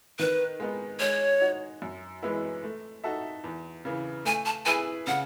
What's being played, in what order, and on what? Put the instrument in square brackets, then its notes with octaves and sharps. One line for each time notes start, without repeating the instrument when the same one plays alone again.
[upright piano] D#3 [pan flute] B4
[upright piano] G#3 B3 D#4
[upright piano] G#3 [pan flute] C#5
[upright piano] D#4 F#4
F#2
E3 G#3 B3 E4
A3
D#4 F#4 A4 E5
E2
C#3 E3
[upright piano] A3 [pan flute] G#5
[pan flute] A5
[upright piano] E4 G#4 B4 [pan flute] G#5
[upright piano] C#3 [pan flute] F#5